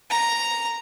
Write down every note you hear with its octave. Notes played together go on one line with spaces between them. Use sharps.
A#5